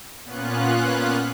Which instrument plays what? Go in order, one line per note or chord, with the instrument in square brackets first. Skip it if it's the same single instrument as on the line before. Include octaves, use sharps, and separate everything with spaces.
[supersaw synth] A#2 B3 C#4 F4 F#6